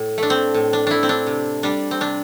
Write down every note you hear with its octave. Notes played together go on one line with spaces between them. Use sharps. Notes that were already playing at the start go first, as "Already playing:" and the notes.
Already playing: A2
A3 D4
C4
A2
D4
A3 D4 E4
C4
D4
C3
G3 D4
C4
C3 D4